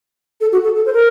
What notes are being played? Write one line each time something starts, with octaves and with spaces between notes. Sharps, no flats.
A4
F#4
A4
A4
C5
A#4